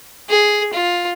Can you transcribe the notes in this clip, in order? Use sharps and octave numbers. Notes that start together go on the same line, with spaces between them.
G#4
F4